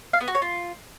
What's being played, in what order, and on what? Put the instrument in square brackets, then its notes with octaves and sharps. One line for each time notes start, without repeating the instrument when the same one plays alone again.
[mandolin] F5
B3
F#4
C#5
F4